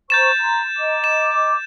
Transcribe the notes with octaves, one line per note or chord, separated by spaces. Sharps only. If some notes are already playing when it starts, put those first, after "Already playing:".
C5 A#5 C#6 G6 A6 E7
A#5 C6
D#5 A#5 D6
E7